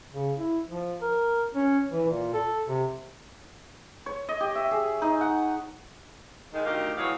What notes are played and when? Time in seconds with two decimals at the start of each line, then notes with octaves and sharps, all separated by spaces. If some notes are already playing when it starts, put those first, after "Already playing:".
0.12 C#3
0.38 E4
0.68 F3
1.02 A#4
1.55 C#4
1.91 E3
2.08 A#2
2.34 A4
2.67 C3
4.06 C#5
4.29 D#5
4.40 G4
4.55 E5
4.71 G#4
5.02 D#4
5.21 F#5
6.54 D#3 G#3
6.66 D2 D#3 G4 A#4 D#5 F5
6.97 A2 E3 F#3 G#4 C#5 F5